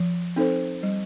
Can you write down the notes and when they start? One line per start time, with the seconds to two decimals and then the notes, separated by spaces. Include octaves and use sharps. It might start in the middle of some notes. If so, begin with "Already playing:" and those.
Already playing: F3
0.36 C4 D#4 A4 C5
0.83 G3